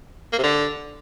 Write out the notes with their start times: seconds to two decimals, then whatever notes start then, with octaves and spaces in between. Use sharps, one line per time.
0.33 A#3
0.38 C3
0.44 D3